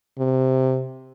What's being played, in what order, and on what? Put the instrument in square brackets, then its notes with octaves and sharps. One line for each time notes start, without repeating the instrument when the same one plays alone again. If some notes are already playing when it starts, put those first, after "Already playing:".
[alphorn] C3